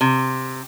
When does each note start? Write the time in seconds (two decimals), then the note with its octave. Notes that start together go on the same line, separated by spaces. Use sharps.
0.01 C3